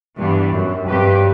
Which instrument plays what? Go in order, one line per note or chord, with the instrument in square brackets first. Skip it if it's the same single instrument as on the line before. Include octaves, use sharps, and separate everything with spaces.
[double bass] G2 [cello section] E3 G3 B3 D4
[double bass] F#2
[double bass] G2 [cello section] F#3 C4 G4 B4